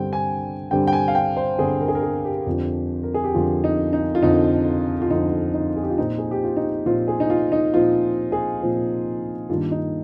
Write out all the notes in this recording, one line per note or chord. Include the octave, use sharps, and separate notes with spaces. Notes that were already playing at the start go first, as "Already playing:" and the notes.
Already playing: G2 D3 G3 C4 G5
G#5
G2 D3 G3 C4 G5
G5
G#5
F5
G5
C5
G2 D3 G3 C4 G#4
A#4
G#4
A#4
G#4
G4
F2 D3 F3
A#4
G#4
G4
F2 D3 F3 F4
D#4
D#4
F4
F2 D3 F3 D#4
F4
F2 D3 F3 D#4
D#4
G#4
G4
F4
A#2 F3 C4 D#4
G#4
G4
F4
D#4
A#2 F3 C4 F4
G#4
D#4
F4
D#4
A#2 F3 C4 F4
G#4
A#2 F3 C4
G2 D#3 A#3 F4
D#4